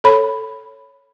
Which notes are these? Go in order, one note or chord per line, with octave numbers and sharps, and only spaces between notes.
A4 C#5 B5